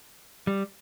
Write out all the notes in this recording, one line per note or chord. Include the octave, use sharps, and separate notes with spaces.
G3